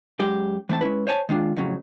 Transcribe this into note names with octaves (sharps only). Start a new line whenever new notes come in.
F#2 G#3 G4
E3 A3 C4 A5
G#3 C#4 E4 B4
C5 C#5 G#5 A5
D#3 G#3 D4 F4
F2 A2 C#3 F#3